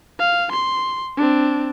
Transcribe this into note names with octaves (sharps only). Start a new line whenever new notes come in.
F5
C6
C4 D4